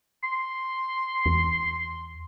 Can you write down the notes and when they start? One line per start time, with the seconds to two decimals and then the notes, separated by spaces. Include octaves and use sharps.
0.23 C6
1.26 E2